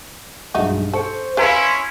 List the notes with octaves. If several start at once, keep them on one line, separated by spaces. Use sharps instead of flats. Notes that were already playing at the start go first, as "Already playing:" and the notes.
B1 G2 G#3 D#4 E4 F#4
A4 C5 C#6 C#7
C#4 E4 B4 C5 F5 G#5 A#5 C6